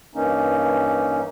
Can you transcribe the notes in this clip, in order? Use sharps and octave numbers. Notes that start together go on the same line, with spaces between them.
G2 E3 A#3 C#4 D#4